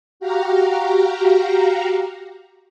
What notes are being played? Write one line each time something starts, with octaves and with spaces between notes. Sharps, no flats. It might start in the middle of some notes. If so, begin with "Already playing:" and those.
F#4 G4 F5 A#5